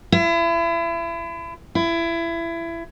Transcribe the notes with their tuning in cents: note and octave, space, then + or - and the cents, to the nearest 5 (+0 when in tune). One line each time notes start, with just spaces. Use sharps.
E4 +35
E4 +25